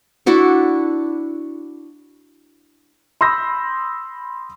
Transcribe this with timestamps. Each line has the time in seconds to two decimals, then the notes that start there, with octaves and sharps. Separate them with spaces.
0.26 D4 E4 F#4 A4
3.21 B5 C6 D#6 E6 G6 A#6